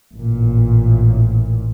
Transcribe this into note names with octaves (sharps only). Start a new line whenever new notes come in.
A1 A#2